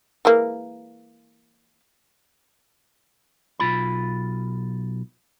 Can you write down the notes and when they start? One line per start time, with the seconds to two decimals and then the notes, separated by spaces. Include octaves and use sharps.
0.25 E3 G#3 A#3
3.60 B1 F4 B5